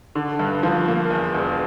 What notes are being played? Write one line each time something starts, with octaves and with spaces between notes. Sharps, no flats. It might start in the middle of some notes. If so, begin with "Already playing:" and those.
D3
G2
F3
A#3
E2
E1